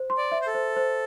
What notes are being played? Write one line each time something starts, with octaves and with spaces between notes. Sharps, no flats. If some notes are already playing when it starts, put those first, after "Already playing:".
Already playing: C5
C6
D5
E5
C5
A4
C5
C5